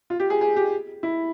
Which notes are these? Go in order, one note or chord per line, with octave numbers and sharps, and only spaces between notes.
F4
G4
G#4
G#4
G4
E4